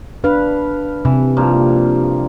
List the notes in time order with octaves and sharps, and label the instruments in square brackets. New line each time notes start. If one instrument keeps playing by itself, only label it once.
[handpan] D4 B4 [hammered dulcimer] F5
[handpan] C3 [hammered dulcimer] E3
[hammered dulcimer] G2 F3 A#3